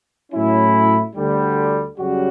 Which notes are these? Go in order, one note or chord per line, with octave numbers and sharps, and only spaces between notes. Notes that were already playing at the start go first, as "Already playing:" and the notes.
A2 F#3 C#4 E4
D2 D3 G3
F#2 C#3 G3 C#4 F#4